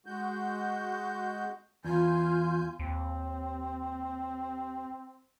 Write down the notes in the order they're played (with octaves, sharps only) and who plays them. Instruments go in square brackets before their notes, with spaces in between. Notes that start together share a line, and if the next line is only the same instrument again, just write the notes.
[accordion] G#3 F#4 G6
[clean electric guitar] E2 [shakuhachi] F4 [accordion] G#5 G6
[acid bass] D#2 [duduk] C4